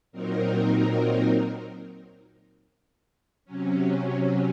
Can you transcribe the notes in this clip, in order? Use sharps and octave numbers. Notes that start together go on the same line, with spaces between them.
A#2 F#3 C4 D#4 A#4
C3 F#3 C#4